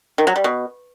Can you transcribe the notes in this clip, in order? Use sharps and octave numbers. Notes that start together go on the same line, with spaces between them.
D#3
F#3
G3
B2